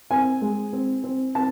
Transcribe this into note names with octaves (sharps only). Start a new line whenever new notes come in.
C4 G#5
G#3
C4
C4
C4 A5